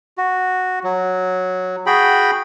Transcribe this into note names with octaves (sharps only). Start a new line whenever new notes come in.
F#4
F#3
F#4 G#4 G5 B5